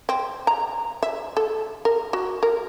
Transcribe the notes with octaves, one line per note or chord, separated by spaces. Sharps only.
C4
A#5
E5
A4
A#4
F#4
A#4